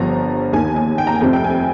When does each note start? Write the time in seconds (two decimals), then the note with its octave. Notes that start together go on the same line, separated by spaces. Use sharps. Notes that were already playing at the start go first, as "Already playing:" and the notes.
Already playing: G1 G2 F3 A#5
0.53 D#2 D#3 G#5
0.76 G#5
0.98 G5
1.07 A#5
1.14 G#5
1.21 F1 F2 C3 F3 G5
1.33 G5
1.44 G#5